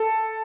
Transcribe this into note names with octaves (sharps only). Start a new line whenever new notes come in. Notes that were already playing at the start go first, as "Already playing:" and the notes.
Already playing: A4